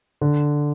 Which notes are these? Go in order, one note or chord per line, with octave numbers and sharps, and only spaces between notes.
D3